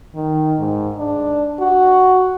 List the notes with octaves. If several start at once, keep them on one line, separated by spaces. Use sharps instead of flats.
D#3
G#2
D4
F#4